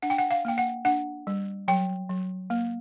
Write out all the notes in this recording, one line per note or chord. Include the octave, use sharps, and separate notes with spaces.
D4 F#5
G5
F#5
F5
A#3 G5
F#5
D4 F#5
G3
F#3 G5
F#3
A#3